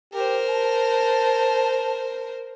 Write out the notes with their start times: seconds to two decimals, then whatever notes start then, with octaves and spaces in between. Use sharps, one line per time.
0.14 G4 A#4 C5
0.49 A5